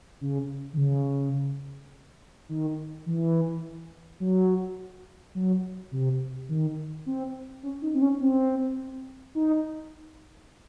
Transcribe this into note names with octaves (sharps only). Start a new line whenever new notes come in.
C#3
D#3
C#3
D#3
E3
F#3
F#3
C3
D#3
C4
C#4
D#4
C4
C#4
C4
D#4